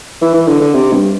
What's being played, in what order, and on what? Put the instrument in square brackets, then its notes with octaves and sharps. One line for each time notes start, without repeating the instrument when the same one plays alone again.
[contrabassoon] E3
E3
D3
D3
C3
G2